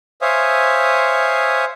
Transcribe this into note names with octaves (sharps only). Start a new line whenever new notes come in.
C5 C#5 E5 F5 G#5 D#6